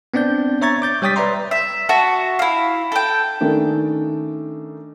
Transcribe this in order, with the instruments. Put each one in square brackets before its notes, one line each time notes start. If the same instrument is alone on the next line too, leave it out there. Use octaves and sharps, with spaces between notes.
[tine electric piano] B3 C4 D4 D5 G6
C#5 E5 A#5 C#6 G#6 A6
D6 G6 A6
G3 C#5 G5 D#6 A6 B6
B4 D5 E5 A#5 C6
[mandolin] E5
F#4 E5 A5
E4 F5
A4 G5
[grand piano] D#3 A3 C#4 D4